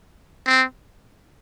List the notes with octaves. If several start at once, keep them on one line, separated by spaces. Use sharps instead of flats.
C4